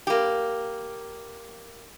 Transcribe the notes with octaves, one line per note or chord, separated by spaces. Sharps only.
A#3 G4